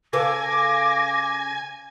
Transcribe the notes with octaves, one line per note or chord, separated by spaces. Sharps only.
C#3 A4 B4 G#5 D6 A#6